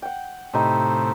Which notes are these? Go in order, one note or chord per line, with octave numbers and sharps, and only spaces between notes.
F#5 G5
A2 C3 D#4 G4 B5